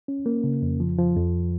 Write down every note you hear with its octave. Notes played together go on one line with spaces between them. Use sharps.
C#4
A#3
C#3
F2
F3
F3
F2